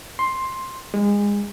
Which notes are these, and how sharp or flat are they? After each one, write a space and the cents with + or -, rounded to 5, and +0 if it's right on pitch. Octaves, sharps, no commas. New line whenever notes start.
C6 +10
G#3 -25